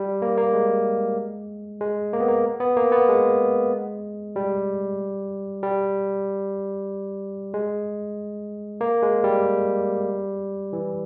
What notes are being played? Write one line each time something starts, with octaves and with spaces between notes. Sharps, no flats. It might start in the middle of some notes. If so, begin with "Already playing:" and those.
Already playing: G3
A#3
A#3
G#3
G#3
A#3
B3
A#3
B3
A#3
B3
G#3
G3
G3
G#3
A#3
G#3
G3
E3